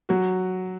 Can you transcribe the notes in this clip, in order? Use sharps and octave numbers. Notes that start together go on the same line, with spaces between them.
F#3 F#4